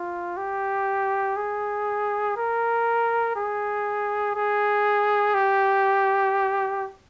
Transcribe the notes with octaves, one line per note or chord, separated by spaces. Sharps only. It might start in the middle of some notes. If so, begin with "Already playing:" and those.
Already playing: F4
G4
G#4
A#4
G#4
G#4
G4